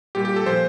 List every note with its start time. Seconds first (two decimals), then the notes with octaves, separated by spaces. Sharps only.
0.15 A#2 G3 G4
0.25 G4
0.36 A4
0.45 A#2 F3 C5